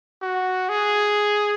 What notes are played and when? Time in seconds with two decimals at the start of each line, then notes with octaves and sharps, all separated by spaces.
0.22 F#4
0.69 G#4